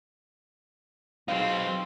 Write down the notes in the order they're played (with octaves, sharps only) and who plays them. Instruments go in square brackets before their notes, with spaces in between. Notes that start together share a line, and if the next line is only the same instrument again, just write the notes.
[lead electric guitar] F#3 D#4 [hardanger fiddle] C4 F4 [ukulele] G#4 C5 F5